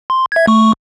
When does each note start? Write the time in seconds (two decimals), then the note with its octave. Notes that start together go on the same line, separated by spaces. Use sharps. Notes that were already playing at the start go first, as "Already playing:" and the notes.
0.10 C6
0.32 E5 G#6
0.47 A3 C#6